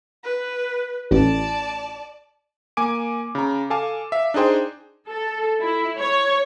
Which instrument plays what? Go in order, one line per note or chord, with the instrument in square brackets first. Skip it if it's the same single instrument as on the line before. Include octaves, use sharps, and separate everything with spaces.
[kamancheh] B4
[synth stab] A1 [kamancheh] D5 A5
[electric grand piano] A#3 G#5 D6 D7
C#3 A#5
A4 F5 G#5 A5 D6
E5 F5
D4 D#4 G#4 C5 G5
[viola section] A4
E4
C#5